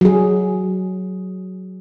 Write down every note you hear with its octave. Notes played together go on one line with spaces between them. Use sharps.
F#3 G#4